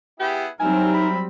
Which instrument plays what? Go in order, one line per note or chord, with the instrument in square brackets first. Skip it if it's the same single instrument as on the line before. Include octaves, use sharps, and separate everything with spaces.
[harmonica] B3 E4 G#4 [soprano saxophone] G4
[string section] F#3 G3 C4 [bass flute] D#4 [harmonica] E4 A#4 [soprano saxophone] G#5
[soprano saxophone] B5